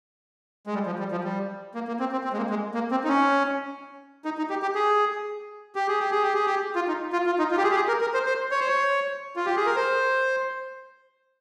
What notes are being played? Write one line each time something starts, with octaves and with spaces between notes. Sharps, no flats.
G#3
G3
F3
G3
F3
G3
A#3
A#3
C4
C4
C4
G#3
A#3
G#3
A#3
C4
D#4
C#4
D#4
D#4
G4
G4
G#4
G4
G#4
G4
G#4
G4
G#4
G4
F4
D#4
F4
F4
D#4
F4
G4
G#4
G4
G#4
A#4
A#4
C5
C5
C#5
C5
C#5
F4
G4
G#4
A#4
C5